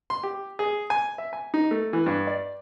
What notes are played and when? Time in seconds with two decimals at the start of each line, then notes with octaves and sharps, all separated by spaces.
0.10 C6
0.23 G4
0.59 G#4
0.90 G#5
1.18 E5
1.33 G#5
1.54 D#4
1.71 A3
1.93 E3
2.06 G2
2.27 D5